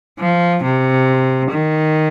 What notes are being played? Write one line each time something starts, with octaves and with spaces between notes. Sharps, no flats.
F3
C3
D#3